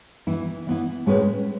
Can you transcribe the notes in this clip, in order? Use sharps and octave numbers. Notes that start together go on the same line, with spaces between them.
E3 B3 E4
E3 B3 E4
A2 G#3 C#4 G#4 B4